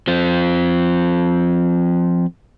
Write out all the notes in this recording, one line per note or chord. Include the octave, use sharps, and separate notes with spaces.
F3 C4